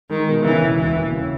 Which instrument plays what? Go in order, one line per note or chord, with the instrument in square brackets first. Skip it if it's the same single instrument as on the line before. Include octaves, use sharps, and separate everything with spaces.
[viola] D#3 [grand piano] G#3
[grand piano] B2
[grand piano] C#3 [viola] E3
[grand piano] E1
[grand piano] D#2 [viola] E3
[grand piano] E1
C#3